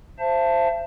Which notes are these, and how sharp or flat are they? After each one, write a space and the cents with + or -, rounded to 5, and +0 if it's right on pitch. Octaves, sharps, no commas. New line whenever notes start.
C5 +0 E5 +45 A5 +5